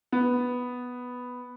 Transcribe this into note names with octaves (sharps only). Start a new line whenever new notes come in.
B3